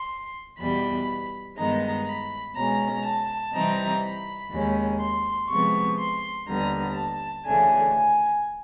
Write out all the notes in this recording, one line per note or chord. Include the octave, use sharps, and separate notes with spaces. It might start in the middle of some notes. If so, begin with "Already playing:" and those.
Already playing: C6
E2 B2 G3 B5
G2 D#3 G#3 B3 D#4 A#5
B5
B2 G#3 C#4 A#5
A5
C3 E3 G3 C4 D#4 A#5
B5
D#2 D#3 G#3 C#4
C6
C3 F3 G#3 B3 C#6
C6
D#2 D3 G3 B3 A#5
A5
D2 C#3 E3 A3 D4 G#5
G#5